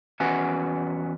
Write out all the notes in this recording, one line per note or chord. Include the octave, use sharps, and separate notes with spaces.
E2 C#4 F#4 B4 F#5 G#5